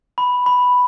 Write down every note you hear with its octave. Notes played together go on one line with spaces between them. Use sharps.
B5
B5